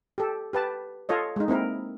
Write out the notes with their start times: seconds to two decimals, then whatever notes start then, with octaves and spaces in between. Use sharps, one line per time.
0.18 G4 A4
0.53 G4 B4 A5
1.09 F4 A4 C#5 D#5
1.36 G#3 D#4
1.48 A#3 C4 E4 A#4